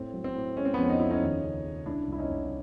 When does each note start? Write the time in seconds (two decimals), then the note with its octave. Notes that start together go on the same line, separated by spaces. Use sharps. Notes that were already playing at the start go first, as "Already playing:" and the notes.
Already playing: A2 C4
0.14 F#3
0.24 C4
0.35 A2
0.57 G#3 C#4
0.65 C4
0.74 F2 B3 C#4
0.89 D#4
1.00 F2 E4
1.11 C#4 D#4
1.22 D#2
1.43 C#3
1.64 C#3
1.86 C2 D4 E4
2.08 C2 E4
2.18 C#4 D#4
2.29 C2